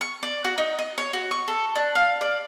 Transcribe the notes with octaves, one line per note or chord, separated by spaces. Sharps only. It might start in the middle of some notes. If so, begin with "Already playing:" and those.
C#6
D5
F#4
D#4
D#5
C#5
F#4
C#6
A4
D4
F5
D5